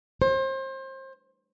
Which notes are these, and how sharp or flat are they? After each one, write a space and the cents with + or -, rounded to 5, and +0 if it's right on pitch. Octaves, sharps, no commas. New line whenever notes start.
C5 +30